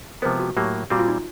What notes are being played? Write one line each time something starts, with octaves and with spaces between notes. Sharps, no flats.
C3 F3 G#3 B3 A#4 C5
F#4
A2 F#3 A#3 G4
A#2 G3 C4 F#4
F4
D#4